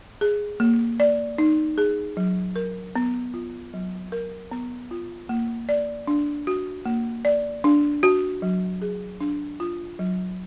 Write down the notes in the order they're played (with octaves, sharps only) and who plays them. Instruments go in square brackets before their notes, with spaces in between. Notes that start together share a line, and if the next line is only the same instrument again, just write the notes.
[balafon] G#4
A#3
D5
D#4
G#4
F#3
A#4
B3
F4
F#3
A#4
B3
F4
A#3
D5
D4
F#4
A#3
D5
D4
F#4
F#3
G#4
D4
F4
F#3